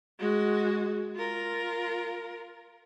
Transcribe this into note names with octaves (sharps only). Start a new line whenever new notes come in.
G#3 F#4
F4 A#4